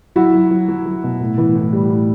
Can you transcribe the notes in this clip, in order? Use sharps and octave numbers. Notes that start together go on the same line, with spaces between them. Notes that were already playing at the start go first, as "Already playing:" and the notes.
F#3 E4 F#4
F#3
F#3
F#3
F#3
B2
A2
E3
A2
G3
A2